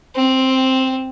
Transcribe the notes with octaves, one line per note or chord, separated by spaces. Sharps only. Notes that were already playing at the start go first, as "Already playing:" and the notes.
C4